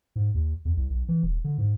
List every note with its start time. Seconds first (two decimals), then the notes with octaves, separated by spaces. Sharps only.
0.16 G#2
0.34 D#2
0.65 E2
0.77 C2
0.90 B1
1.09 E3
1.23 D#1
1.44 D3
1.58 G#2